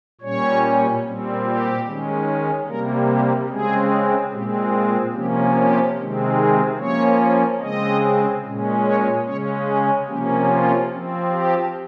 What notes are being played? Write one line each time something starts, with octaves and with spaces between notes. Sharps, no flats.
A#2 G3 C#4 C#5
A#2 G3 C4
G4
D#3 G#3 C#4
C3 G3 A#3 A#4
G4
C#3 G#3 C4 G#4
A#2 G#3 C4 G4
F4
C3 F3 A#3 C#4 G4
G4
C3 D#3 G#3 C4
G#4
F3 A#3 C#4 C#5
C#3 G#3 C4 D#5
A#2 G#3 C#4
C#5
C#3 G#3 C#4 C#5
G#4
C3 F3 A#3 C#4 G4
F4
F3 C4
G4